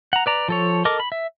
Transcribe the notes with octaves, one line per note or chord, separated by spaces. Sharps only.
F#5 A#5
B4 D5 A#5
F3 A4 C#5
A4 A#4 D#5 D6
B5
E5